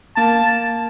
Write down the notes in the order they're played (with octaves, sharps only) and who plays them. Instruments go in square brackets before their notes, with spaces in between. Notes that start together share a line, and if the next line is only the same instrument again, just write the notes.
[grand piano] A#3 [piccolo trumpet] A5